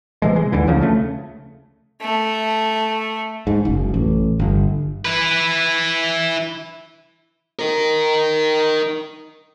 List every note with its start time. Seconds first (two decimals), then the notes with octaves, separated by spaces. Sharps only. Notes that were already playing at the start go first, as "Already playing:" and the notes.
0.22 C3 E3 G#3
0.36 G#3
0.52 D#2 D3 E3
0.67 D2 C#3 F3
0.81 C#3 A3
2.01 A3
3.47 G#2
3.65 F#1
3.94 A1
4.40 G1
5.05 E4 B4
7.59 D#4 A#4